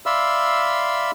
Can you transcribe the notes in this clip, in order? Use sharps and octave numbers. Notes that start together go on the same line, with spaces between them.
D5 E5 F5 B5 C6 E6